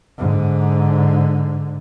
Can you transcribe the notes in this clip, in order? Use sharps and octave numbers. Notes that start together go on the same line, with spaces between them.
G#2 D3